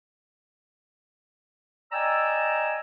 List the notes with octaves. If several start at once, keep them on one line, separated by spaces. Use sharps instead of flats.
D5 D#5 G5 G#5 A#5 E6